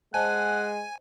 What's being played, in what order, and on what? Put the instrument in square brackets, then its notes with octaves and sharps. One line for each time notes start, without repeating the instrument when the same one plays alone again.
[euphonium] G#3 [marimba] C5 D#5 A5 [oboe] F#5 [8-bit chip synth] G#5